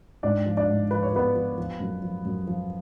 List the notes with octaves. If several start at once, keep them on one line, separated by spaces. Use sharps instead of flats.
G#2 D4 D5
F3
D4 D5
G#2
F3 B4
C#5
F3 B3 B4
F3
F3
F#2
F3
F#2
F3